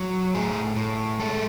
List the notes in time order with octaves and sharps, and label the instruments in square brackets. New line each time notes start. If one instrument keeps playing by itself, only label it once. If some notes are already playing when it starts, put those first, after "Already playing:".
Already playing: [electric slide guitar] F#3
A2 G#4
A2
G#3 A4